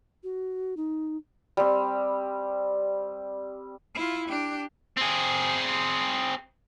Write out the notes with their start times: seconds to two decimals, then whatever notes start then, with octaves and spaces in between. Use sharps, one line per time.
0.24 F#4
0.77 D#4
1.57 G3 C4
3.95 E4 F4
4.29 D4 G4
4.97 C4 G#4